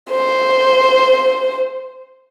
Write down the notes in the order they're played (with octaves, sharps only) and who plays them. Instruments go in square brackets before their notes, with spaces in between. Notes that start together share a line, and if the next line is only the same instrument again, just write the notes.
[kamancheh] C5